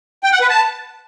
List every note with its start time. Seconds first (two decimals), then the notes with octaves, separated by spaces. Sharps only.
0.23 G5
0.32 F#5
0.41 B4
0.49 A5